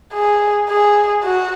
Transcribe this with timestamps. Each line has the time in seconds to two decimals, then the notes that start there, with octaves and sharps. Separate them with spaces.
0.13 G#4
0.69 G#4
1.23 F#4